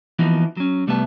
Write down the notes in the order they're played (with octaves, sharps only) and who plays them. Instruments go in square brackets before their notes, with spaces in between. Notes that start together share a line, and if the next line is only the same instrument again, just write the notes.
[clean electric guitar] E3 F3 A#3 B3 D#4 F#4
F#3 C#4
C2 G3 A3 B3 E5 A5